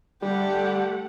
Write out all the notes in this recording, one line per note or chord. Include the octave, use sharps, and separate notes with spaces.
D3 G3 A3 G4 A4 F#5